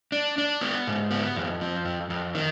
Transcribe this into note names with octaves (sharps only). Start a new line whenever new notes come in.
D4
D4
B3
G#2
B3
F2
F3
F2
F2
D#3